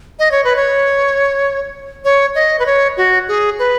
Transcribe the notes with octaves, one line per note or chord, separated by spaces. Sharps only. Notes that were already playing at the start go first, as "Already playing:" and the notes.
D#5
C#5
B4
C#5
C#5
D#5
B4
C#5
F#4
G#4
B4